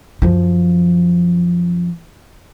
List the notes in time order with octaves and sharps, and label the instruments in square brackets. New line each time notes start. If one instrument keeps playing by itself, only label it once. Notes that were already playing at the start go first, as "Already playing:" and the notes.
[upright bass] F#2 F3